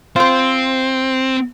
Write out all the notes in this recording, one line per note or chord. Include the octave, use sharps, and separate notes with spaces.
C4 F4 C5